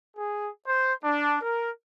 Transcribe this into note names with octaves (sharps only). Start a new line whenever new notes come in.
G#4
C5
D4
A#4